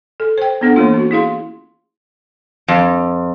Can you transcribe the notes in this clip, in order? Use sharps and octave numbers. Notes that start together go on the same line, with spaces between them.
A4
C5 G5
B3 C#4 D4 A4 F#5
E3 A3 A#3 F4
C#4 F#4
E4 G#4 F5 C6
F2